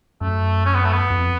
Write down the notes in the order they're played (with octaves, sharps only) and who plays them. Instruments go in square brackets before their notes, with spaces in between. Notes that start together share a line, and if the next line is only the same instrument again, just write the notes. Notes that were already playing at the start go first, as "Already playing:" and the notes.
[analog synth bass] F#2 [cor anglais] A3
[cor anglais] C#4
B3
A3
B3
[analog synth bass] F2